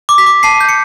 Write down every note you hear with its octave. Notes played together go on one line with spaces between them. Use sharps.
D6
B6
D6
A5 C7
G6
C#7